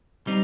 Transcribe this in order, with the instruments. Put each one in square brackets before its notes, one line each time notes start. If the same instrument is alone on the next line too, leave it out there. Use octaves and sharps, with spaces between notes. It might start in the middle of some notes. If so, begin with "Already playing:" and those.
[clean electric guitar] G3 C4 D#4